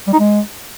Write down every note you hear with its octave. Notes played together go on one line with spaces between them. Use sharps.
G3
D#4
G#3